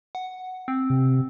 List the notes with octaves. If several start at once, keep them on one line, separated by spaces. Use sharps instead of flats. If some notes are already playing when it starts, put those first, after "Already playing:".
F#5
C4
C3